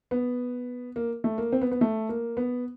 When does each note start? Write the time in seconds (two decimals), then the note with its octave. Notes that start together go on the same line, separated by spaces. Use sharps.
0.11 B3
0.96 A#3
1.24 A3
1.38 A#3
1.52 C4
1.62 B3
1.72 B3
1.81 A3
2.09 A#3
2.37 B3